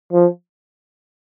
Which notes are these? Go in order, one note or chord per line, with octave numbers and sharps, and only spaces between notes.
F3